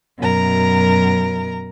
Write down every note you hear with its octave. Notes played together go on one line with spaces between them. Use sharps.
F#2 B2 A#4 A#5